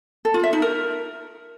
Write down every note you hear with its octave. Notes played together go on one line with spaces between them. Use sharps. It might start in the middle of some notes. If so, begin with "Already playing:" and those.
A4
F4
E5
D#4
A#4